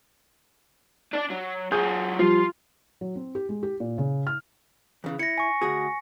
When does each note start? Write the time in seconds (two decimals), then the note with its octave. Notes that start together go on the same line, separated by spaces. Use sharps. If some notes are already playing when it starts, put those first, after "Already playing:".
1.13 D4 D5
1.30 F#3
1.72 F#3 F4 G#4 D#6 G6
2.19 F3 G3 F4
3.01 F#3
3.16 C4
3.35 G4
3.49 G#3
3.63 G4
3.80 A#2
3.98 C#3
4.27 F6
5.04 E2 C#3 E3
5.19 E4 A#6 C#7
5.38 G#5 C#6
5.62 D2 F#4 G#4